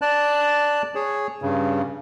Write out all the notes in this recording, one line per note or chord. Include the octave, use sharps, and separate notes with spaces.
D5 A5 F#6
G#4 C#5
G2 C#3